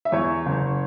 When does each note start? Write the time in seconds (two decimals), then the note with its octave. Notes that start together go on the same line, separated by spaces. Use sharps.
0.05 E5
0.12 E2 C#5
0.46 F#1